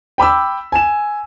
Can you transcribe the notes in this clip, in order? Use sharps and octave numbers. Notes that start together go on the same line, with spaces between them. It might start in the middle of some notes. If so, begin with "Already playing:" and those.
G5 B5 D6 E6
G#5 E7